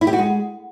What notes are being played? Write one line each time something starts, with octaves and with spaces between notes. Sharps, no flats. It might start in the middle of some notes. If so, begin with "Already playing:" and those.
E4
G4
F#4
G#3